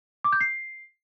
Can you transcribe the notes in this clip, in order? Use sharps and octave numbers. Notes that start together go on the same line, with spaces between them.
D6
G6
C7